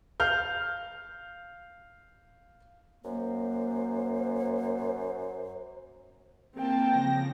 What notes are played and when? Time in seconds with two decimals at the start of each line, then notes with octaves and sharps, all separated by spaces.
0.20 F5 F6 G6
3.04 F#2 A#3 C5
6.55 A#3 C4 G5 A5
6.90 C#3 F3 A#6